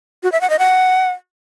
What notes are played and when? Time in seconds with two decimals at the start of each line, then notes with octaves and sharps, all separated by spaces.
0.23 F#4
0.32 E5
0.41 F#5
0.50 D#5
0.59 F#5